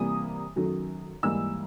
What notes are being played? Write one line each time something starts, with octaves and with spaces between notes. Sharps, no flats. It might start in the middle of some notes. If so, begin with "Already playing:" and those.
Already playing: C3 E3 G3 A#3 D#6
F#2 D#3 F#3 A3
G#2 E3 G3 A#3 E6